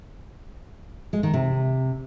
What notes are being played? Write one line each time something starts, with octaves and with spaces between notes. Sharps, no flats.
G#3
D#3
C3